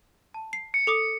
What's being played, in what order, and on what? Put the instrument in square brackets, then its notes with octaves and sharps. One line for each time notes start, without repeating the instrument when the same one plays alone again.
[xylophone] A5
C7
[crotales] C#7
[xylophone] A4 D6 D#6